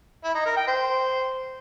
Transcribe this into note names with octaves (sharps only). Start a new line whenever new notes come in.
E4
D#4
A#4
G5
C5